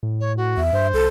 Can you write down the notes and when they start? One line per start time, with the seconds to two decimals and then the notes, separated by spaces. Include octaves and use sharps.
0.03 A2
0.20 C#5
0.37 F#4
0.57 E2 E5
0.73 G2 C5
0.94 C2 A4